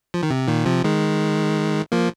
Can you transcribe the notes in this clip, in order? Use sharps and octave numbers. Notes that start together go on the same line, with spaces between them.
F3
D#3
C3
A#2 D#3
C3 F3
D#3 G#3
F3 A#3